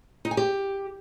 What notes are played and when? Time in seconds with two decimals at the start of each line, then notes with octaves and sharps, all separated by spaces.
0.25 D#4
0.31 G#5
0.37 G4